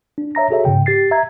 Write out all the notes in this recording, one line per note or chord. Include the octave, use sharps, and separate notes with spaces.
D4
C#5 E5 A#5 A#6
F#4 G#4 A4 C#5 E5
G#2 C#3 G5
G4 A6 C7
E5 A#5 G#6